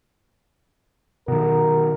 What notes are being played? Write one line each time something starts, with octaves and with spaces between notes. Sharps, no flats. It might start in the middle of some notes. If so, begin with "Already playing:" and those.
B2 D#3 A#4